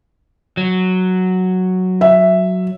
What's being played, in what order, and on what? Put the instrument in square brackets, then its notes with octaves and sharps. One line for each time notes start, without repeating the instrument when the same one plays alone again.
[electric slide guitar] F#3
[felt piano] E5